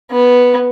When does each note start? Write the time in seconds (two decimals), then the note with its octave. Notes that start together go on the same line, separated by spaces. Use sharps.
0.11 B3